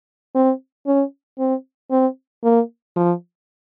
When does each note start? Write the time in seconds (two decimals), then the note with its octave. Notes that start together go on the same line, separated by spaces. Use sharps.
0.35 C4
0.87 C#4
1.39 C4
1.91 C4
2.44 A#3
2.96 F3